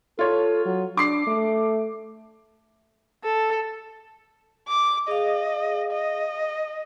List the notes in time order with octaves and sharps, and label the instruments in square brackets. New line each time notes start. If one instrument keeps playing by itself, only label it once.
[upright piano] F4 C#5 [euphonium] A4
[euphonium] F#3
[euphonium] D4 [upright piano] D6 C7
[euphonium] A3
[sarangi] A4
[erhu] D6
[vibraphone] G#4 F5 [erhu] D#5
[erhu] D#5